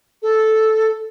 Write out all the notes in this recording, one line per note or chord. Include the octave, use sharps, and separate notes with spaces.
A4